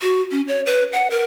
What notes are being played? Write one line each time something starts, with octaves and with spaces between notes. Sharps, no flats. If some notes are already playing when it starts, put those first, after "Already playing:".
F#4
C#4
C#5
B4
F#5
A#4